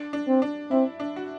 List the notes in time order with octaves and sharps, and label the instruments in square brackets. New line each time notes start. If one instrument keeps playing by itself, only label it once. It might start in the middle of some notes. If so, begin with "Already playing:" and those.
Already playing: [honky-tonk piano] D4
D4
[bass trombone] C4
[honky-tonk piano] D4
[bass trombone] C4 [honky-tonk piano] E4
[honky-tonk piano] D4
F#4